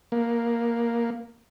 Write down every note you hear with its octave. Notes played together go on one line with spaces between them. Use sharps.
A#3